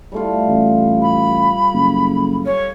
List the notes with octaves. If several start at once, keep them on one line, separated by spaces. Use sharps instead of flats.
G3 A3 F4
A1
B5
F#1
C#5